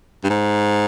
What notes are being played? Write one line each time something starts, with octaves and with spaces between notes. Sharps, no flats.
G2
G#2